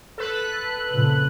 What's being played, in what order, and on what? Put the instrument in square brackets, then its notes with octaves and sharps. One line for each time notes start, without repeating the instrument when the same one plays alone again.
[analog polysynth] A4 B4 F#6
[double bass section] F2 A#2 C#3